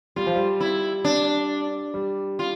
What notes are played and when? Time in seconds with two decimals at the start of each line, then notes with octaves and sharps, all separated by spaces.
0.16 G3 F4
0.27 F3
0.36 G3
0.61 E4
1.05 D4
1.94 G3
2.39 F4